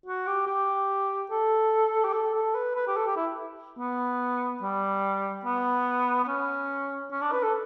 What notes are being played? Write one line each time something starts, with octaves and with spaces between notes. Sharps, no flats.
F#4
G4
G4
A4
G4
A4
A4
B4
B4
G4
A4
G4
E4
B3
G3
B3
B3
C#4
C#4
D4
B4
A4